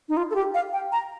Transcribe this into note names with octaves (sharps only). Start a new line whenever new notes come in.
D#4
F4
A4
G4
F5
G5
A#5